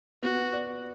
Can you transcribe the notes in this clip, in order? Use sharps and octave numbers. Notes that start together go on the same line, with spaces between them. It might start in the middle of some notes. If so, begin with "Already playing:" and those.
B3 F#4
D5